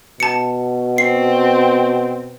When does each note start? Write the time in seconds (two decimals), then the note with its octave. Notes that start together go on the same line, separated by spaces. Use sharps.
0.20 B2 A5 C#7
0.98 C4 C7